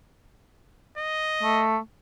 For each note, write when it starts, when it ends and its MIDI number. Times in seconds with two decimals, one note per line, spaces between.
0.98 1.66 75
1.43 1.78 57